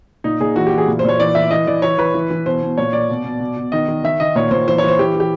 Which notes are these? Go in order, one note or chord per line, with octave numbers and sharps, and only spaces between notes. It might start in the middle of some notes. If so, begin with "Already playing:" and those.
A#2 D#4
A#2 G#4
E3 F#4
G4
E3
G#4
A#2
C5
A#2 C#5
E3 D5
E3 E5
E3 D#5
E3 D5
E3 C#5
E3 B4
E3
E3
B2 C5
B2
A#2 C#5
A#2 D5
B2
B2
B2
B2
D#3 D#5
D#3
D#3 E5
D#3 D#5
A#2 C#5
A#2 C5
E3 C5
C#5
E3 C5
E3 G4
E3 G4